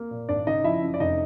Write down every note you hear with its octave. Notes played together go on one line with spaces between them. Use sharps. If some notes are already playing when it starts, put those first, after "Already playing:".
Already playing: A#3
A#2
G#1 D4 D5
C#3 D#4 D#5
F3 E4 E5
F#2
D5
F1 D#4 D#5